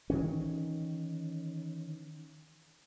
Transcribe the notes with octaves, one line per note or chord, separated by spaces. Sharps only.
D#3 E3 C#4